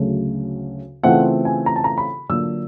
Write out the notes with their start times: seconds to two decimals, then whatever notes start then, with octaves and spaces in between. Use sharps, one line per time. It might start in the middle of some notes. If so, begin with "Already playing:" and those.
Already playing: D2 C#3 F#3 A3
1.03 C#3 E3 A3 C4 F4 F#5
1.45 G#5
1.66 A#5
1.76 A5
1.84 A#5
1.98 B5
2.29 D3 F#3 A#3 D4 F4 E6